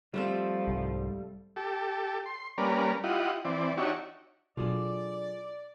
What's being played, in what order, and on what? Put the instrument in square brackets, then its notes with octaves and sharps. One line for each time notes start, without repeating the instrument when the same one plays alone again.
[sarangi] F3 [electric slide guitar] G3 [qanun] A3 C4 A4
[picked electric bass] C2 G#2
[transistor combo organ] G4 A4
C6
G3 A#3 C#4 A#4 B4 D5
E4 F4 G4 D#5 F#5
E3 C4 D5
D4 D#4 F#4 G4 C#5 E5
[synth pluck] B2 [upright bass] F#3 D4 [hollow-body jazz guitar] F4 G#4 A4 [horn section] D5